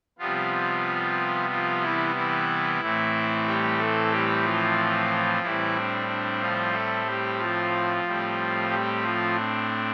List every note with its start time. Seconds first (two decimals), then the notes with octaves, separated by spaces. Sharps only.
0.18 C3 F3 G3 B3 F4
1.50 F3 F4
1.82 E3 E4
2.15 E3 E4
2.81 A2 E3 A3 C4
3.46 G3 G4
3.78 A3 A4
4.11 G3 G4
4.44 F3 F4
5.43 A2 E3 G3 C4 E4
5.75 D4
6.07 D4
6.40 F3 F4
6.73 A3 A4
7.06 G3 G4
7.38 F3 F4
8.04 A2 G3 C4
8.69 G3 G4
9.02 F3 F4
9.34 D4